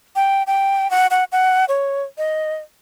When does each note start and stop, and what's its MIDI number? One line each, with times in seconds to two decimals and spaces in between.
0.16 0.43 79
0.47 0.90 79
0.90 1.07 78
1.11 1.24 78
1.32 1.65 78
1.68 2.02 73
2.18 2.56 75